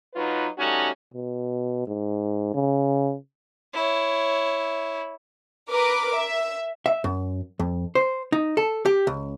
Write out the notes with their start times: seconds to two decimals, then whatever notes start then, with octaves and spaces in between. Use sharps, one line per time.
0.15 F#3 D#4 F4 B4
0.58 G3 A3 C#4 D#4 F#4
1.14 B2
1.87 G#2
2.54 C#3
3.74 E4 C#5
5.70 A#4 B4 D6
6.14 E5
6.86 E5
7.04 F#2
7.59 F2
7.95 C5
8.32 D#4
8.57 A4
8.86 G4
9.07 C#2